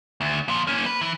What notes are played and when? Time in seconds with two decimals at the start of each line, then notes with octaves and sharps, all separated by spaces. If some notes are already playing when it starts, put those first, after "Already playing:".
0.21 D2
0.48 A#2 F3
0.67 A#3 C#4
0.86 B4
1.01 E3